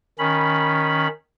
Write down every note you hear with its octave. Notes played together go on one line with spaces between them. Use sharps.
D#3 C#4 B5